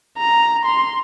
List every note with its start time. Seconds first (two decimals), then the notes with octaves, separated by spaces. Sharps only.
0.18 A#5
0.65 C6